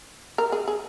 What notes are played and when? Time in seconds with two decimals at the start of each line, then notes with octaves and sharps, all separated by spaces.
0.38 A#4
0.52 G#4
0.68 G#4